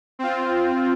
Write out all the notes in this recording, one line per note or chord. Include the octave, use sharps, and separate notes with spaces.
C4 F4